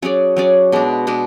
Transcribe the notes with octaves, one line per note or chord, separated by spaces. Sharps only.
F#3 C#4 G#4 D5
F#3 C#4 G#4 D5
B2 G#3 D4
B2 G#3 D4